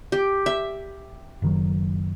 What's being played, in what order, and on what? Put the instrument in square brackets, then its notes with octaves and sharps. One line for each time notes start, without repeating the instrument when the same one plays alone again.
[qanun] G4
E5
[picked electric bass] F#1 D#3 F#3